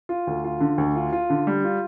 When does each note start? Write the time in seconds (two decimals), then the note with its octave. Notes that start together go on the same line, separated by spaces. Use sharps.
0.09 F4
0.27 D2
0.44 F4
0.60 D3
0.78 D2
0.96 F4
1.13 F4
1.30 D3
1.47 G3
1.64 F4